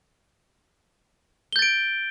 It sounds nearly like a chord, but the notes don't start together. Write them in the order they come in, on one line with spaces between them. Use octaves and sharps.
G7 G6 A6 D7